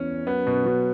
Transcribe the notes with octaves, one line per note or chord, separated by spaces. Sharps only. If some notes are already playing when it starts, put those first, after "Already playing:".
Already playing: E2 C#4
F#2 B3
B2
B2 F#3